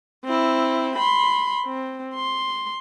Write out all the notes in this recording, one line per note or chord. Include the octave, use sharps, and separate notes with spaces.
C4 E4
B5 C6
C4
C6